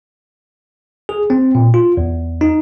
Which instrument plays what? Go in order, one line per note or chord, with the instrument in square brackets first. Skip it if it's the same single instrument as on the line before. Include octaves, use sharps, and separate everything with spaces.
[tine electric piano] G#4
C4
A#2
F4
E2
D#4